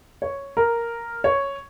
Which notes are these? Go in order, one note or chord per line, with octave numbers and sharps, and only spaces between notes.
C#5
A#4
C#5